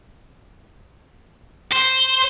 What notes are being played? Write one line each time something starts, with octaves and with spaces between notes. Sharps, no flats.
C5